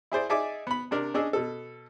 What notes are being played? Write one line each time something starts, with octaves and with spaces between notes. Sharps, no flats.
E4 G#4 C5 D5
D#4 G#4 D5 E5 G#5 D6
B3 B5
C3 D4 A#4
C#4 D4 G#4 D#5 E6
B2 A4